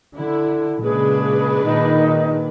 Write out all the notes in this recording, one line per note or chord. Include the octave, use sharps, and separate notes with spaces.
D3 E4
A#2 C#3 G#3 D4 G#4 B4
A#2 D#3 D#4